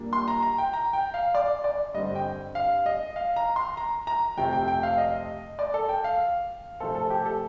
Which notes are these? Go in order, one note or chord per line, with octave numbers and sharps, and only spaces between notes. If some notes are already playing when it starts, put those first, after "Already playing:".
Already playing: A#2 G3 A#3 D4
C6
A#5
A#5
G5
A#5
G5
F5
D5
D5
G2 D3 G3 C4 D#5
G5
F5
D#5
F5
A#5
C6
A#5
A#5
F2 C3 F3 A3 G5
G5
G5
F5
D#5
D5
A4
G5
F5
C3 F3 A3 C4 A4
A4
G4
A4